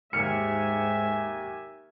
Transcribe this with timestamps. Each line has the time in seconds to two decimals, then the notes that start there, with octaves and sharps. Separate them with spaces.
0.13 D#2 G#2 E5 G#5 F6 C#7